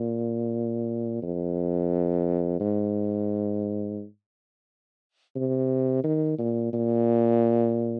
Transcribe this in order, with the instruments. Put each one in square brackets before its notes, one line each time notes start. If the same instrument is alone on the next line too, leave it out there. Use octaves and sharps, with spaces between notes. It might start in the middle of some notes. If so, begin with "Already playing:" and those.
Already playing: [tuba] A#2
F2
G#2
C3
D#3
A#2
A#2